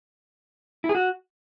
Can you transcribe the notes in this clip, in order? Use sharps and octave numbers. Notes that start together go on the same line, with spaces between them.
E4
G#4
F#4